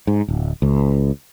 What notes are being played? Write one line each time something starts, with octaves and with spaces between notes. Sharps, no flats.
G#2
D1
C#2